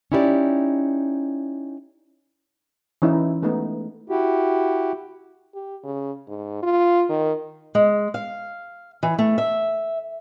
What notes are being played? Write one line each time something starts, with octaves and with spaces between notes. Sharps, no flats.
C#4 D#4 E4 G4 B4 D5
E3 C#4 D#4 E4
G#3 A3 B3 D#4
E4 F#4 G4
G4
C#3
G#2
F4
D#3
G#3
F5
E3
A3
E5